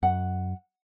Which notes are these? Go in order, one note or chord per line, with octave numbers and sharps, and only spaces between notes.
F#2 F#5